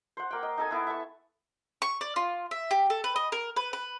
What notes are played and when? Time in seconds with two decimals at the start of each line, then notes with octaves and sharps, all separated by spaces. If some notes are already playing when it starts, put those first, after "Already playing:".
0.17 C5 F#5
0.31 A#3 G5
0.43 D#5
0.58 D#4 A4 G#5
0.71 B3 E4
0.87 E5 A5 C#6
1.82 C#6
2.01 D5
2.16 F4
2.51 E5
2.71 G4
2.90 A4
3.04 B4
3.16 D#5
3.32 A#4
3.56 B4
3.73 B4